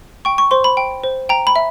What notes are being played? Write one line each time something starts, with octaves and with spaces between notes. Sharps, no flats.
G5 C#6
C#6
C5 C6
B5
G5
C5
G5 A#5
B5
E5